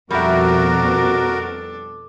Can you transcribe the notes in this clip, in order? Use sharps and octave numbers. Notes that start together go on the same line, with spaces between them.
F2 B2 G3 D4 F#4 A4 A#4 E5